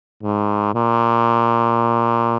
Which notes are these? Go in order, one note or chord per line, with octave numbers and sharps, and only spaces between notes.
G#2
A#2